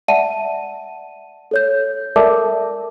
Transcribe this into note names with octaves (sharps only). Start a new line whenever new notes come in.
D5 E5 F#5 A5 D#7
A4 C#5 G6
A4 A#4 D5 E5 A5 D6